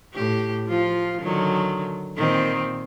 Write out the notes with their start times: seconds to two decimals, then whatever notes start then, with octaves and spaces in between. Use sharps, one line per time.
0.14 A2 G4
0.67 F3 F4
1.22 D3 D#3 F#3
2.15 A#2 D#3 C4